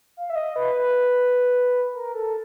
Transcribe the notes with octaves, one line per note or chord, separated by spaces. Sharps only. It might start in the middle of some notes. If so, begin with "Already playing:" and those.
F5
E5
D#5
B4
A#4
A4